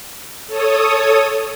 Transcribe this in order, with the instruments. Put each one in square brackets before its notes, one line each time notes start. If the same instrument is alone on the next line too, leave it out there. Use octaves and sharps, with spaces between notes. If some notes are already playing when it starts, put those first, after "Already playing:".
[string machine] A4 C#5 D#6